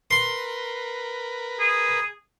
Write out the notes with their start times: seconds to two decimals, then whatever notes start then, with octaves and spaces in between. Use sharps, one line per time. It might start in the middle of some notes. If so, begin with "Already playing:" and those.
0.11 A#4 B4 C6
1.60 G#4